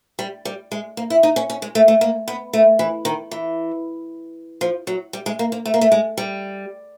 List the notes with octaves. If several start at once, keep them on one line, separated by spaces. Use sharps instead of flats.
G3
G3
G#3
A#3
E4
D#4
C#4
C#4
G#3
A3
A3
A#3
B3
A3
E3
D#3
E3
F3
F#3
G3
G#3
A#3
A#3
A3
A#3
A3
G#3
G3